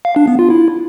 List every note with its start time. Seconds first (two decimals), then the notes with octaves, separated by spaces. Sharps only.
0.05 F5
0.16 D4
0.28 B3
0.39 F4
0.50 E4